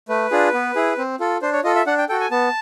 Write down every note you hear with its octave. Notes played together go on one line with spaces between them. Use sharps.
A3 B4
D4 F4 G#4
B3
E4 G#4
C4
F4 A4
D4 C5
C#5
F4 A4 D#5
E5
D4 F#5
G5
F#4 A4 G5
G#5
B3 A5